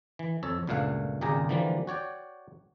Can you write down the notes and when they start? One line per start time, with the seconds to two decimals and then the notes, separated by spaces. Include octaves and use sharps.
0.19 E3
0.43 F2 A4 C#5
0.67 C#2 G2 A#2 A3 F5 F#5
1.21 G#1 C#2 A#2 G4 G#4 A#5
1.49 D3 E3 F3 G3 A#3
1.87 F#4 C#5 D5 G5